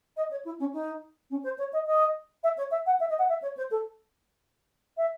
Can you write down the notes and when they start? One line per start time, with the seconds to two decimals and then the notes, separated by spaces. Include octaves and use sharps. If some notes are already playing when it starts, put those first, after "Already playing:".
0.17 D#5
0.31 C#5
0.45 E4
0.59 C#4
0.73 D#4
1.30 C#4
1.44 C5
1.58 C#5
1.73 D#5
1.86 D#5
2.43 E5
2.57 C#5
2.71 E5
2.86 F#5
3.00 E5
3.09 D#5
3.19 F#5
3.29 E5
3.42 C#5
3.57 C5
3.71 A4
4.97 E5